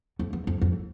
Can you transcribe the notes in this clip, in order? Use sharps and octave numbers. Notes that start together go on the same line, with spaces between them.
F2
E2
F2
F2